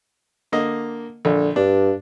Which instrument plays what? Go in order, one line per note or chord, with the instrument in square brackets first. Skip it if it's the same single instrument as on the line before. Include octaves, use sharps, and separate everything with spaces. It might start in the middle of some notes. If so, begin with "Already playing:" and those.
[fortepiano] D3 A#3 D#5
[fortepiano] A#1 [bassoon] D3
[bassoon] G2 [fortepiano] D4